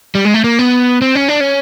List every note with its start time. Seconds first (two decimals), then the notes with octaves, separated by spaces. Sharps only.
0.15 G3
0.25 G#3
0.34 A3
0.44 A#3
0.59 B3
1.02 C4
1.15 C#4
1.28 D4
1.41 C#4